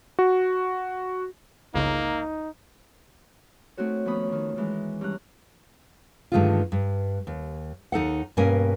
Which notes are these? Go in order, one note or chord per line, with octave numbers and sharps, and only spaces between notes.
F#4
G1 C#2 C#3 A#3 D#4
A3 C4 D#4 F#4 C#5
D#2 F3 B3 C#4 B5 D#6
F2 D#3
D#3 E3 G#3
G2 C#4 A#5 F#6
G2 D3 D#3 G#3 A3 F4
G2
D#2
D#2 D#4 A4 F#5
G2 B2 A#3 C#4 A#4 G#5